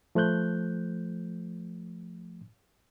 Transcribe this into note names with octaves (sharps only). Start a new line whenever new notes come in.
F3 A3 C5 F#6 G6